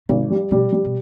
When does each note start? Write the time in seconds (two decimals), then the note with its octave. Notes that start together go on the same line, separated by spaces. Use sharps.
0.09 G#1 C3
0.30 G3
0.51 B2 G3
0.73 G3
0.84 B2